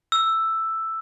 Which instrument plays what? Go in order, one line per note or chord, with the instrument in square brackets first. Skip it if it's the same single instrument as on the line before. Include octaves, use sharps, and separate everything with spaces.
[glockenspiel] E6